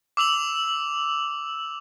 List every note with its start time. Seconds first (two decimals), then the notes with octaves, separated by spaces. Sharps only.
0.17 D6 E6 F7 F#7